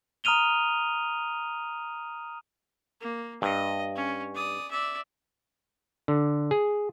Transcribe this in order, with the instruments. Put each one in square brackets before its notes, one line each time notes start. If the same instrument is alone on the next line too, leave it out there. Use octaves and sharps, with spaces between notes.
[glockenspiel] A#5 D#6 F6 D#7 F7 G7
[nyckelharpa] A#3
[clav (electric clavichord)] G2 [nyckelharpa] D#5
[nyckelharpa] C#4
D5 D#6
D5 E5
[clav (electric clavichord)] D3
G#4